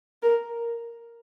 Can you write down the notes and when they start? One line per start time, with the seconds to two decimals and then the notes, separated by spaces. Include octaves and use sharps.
0.22 A#4